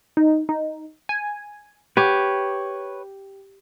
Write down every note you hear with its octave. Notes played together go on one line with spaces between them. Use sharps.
D#4
D#4
G#5
G4 B4 C#5